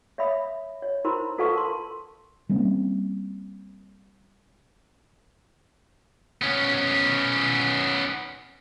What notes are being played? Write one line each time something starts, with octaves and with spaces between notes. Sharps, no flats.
C#5 E5 F5 B5 D#6
C#5
E4 A#4 C5 B5 C6
F4 A4 B4 F5 A5 C#6
A#4 A5 C6
G3 A#3 C4 C#4
B3 C#4